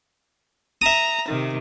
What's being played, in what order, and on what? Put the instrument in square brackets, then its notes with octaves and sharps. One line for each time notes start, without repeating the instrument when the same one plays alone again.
[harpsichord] E5 D#6 [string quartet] A#5
[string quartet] C3 D#3